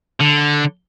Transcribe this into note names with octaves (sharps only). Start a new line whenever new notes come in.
D3